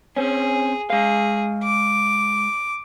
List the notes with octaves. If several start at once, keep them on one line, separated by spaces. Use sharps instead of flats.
C4 C#4 G#4
G#3 G#4 F5
D6